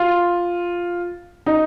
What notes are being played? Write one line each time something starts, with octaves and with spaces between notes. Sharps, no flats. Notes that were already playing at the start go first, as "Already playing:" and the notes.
Already playing: F4
D#4